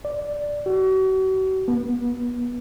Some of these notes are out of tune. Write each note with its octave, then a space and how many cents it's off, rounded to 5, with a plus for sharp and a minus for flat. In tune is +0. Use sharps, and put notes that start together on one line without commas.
D5 +0
F#4 +40
B3 -30